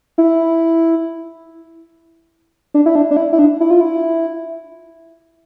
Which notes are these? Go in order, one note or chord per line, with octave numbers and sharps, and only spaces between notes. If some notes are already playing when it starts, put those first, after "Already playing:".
E4
D4
E4
D4
D4
E4
E4
D4
E4
F4
E4